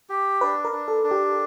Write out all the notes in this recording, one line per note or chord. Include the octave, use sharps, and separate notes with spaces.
G4
D4 B4
A#4
D4
A4
D4
G4